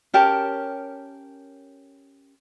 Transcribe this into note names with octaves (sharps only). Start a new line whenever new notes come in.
C#4 G4 A#4 A5